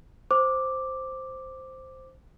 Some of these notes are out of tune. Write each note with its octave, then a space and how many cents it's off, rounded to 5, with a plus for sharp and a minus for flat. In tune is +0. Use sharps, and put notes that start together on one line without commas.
C5 +0 D6 +0